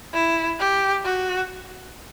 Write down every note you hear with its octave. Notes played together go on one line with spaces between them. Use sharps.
E4
G4
F#4